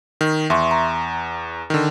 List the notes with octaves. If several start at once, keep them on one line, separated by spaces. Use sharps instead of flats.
D#3
E2 E5 C6 C#6
A#5
D3 D#3